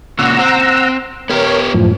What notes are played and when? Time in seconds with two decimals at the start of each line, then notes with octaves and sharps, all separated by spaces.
0.19 A#2 C#3 F#5 A#5 E6
0.39 C4
1.29 B3 G4 A#4 C#5
1.74 F#2 A2 F3